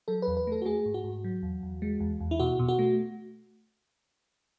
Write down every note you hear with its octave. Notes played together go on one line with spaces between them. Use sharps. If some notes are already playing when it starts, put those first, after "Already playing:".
F#3 A4
B4
E2
B4
A3 A4
F#4
A3 G#4
G#2
F#4
G#2
F#3
E2
E2
G#3
E2
E2
E4
B2 F#4
B2
F#4
A3